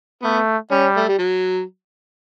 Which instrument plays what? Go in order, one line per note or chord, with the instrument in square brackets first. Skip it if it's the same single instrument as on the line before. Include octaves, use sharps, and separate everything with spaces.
[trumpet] A3 [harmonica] B3
[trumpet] G3 [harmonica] C#4
[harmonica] A3
G3
F#3